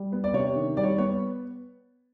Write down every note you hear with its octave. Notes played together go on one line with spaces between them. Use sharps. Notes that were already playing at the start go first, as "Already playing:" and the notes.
Already playing: G3
B3
D5
C3 C#5
D#3
G3 D5
C#5
B3 C#5